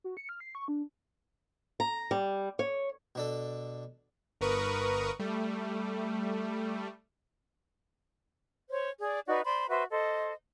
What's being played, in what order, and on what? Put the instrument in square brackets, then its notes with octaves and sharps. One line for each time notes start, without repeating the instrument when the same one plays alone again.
[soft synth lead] F#4
C#7
F6
C7
C#6
D4
[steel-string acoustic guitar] A#5
G3
C#5
[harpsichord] B2 D4 A4
[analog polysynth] G1 A#4 B4 C#6 D#6
G3 A3
[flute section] C5 C#5
G#4 D5
D#4 F#4 B4 D5
C5 D5 B5 C6
F#4 B4 C5 E5
A4 C5 D#5